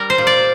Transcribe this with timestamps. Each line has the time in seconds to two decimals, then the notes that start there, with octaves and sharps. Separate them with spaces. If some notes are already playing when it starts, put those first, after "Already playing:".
Already playing: G3 A#4
0.10 C5
0.18 A#2
0.27 D5